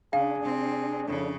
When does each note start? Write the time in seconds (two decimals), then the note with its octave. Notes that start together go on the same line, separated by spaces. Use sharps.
0.13 C#3 D4 G#4 F5
0.42 C3 C4
1.08 F2 A2 C#3